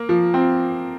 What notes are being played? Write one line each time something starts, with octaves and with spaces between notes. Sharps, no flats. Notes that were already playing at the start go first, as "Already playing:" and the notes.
Already playing: A#3
F3
C4